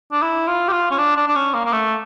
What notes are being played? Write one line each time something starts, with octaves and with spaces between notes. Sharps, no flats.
D4
E4
F4
G4
F4
C#4
D4
D4
D4
C#4
A#3
A#3
A3